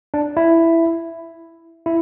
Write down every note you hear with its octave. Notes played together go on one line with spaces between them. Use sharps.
D4
E4
E4